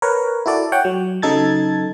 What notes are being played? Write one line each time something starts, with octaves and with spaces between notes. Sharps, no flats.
A#4 B4 C#5
E4 F#4 A4 D5
C#5 F#5 G5
F#3
C#3 F#3 D#4 A4 G#6 A6